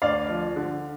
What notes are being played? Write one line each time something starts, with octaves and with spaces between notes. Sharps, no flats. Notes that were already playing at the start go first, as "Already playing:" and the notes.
D2 D5 F5
F3
D3